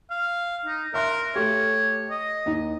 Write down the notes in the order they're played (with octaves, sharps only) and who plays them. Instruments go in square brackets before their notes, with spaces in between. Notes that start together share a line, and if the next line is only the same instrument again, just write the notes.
[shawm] F5
D#4
[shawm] A#4 [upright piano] E5 C6 F#6
[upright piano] A3 G4 [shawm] C#5
[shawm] D#5
[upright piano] D#2 D#4